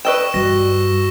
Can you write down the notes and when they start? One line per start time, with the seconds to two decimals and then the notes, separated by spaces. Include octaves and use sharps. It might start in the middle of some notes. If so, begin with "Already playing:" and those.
0.05 B4 D5 D#5 G5 C#6 E6 E7
0.34 G2 F#4 A#6